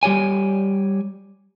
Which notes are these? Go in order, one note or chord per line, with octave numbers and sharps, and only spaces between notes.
G3 G4 C#5 G#5